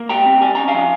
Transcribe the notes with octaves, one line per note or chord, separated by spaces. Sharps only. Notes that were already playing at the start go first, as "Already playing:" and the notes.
Already playing: A#3
G3 G5 A#5
C4
G3 G#5
C#4 A#5
F5 G#5
F3